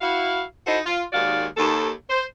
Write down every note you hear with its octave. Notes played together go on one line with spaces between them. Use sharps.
E4 F#4 F5
D#4 E4 F#4 A4 C5 D#5
F4
D#2 D#3 G#3 F#4 D5 F5
D#2 A4
C5